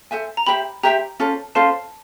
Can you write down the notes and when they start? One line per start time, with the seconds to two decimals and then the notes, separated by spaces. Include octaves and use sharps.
0.11 A4 C5 E5 G#5
0.37 A#5
0.47 G4 C5 E5 G5 B5
0.83 G4 C5 E5 G5 A#5
1.20 C#4 F4 A4 C5
1.55 C#4 F4 A4 C5 A5